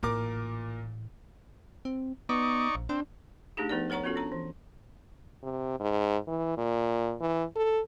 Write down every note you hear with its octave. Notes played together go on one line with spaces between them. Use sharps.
A1 A#2 A#4 D6
C4
B3 D#4 D5 C#6
A#1
C4 D4
A3 D4 D#4 G4 G#4
F3 B3 D#4 A#4 D5
A#4 C#5 F#5 A#5 C#6
B3 C#4 F4 F#4 A4
D4 A#5
E3
C3
G#2
E3
A#2
E3
A4